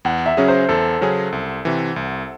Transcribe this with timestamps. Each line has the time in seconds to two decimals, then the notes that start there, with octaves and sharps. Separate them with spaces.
0.05 E2 F#5
0.26 E5
0.37 C#3 F#3 C#4 G#4
0.48 C5
0.69 E2 A4
1.01 C#3 F#3 C#4 G#4
1.32 C2
1.65 C3 E3
1.96 C2